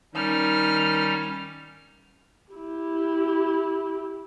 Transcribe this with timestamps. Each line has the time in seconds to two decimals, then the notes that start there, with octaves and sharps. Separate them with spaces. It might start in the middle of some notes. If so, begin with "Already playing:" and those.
0.14 D#3 G3 C#4 D#4 F6
2.53 E4 G4